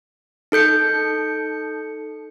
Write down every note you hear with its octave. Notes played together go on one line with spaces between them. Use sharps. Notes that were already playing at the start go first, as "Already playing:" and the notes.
D#4 A4 G6 C#7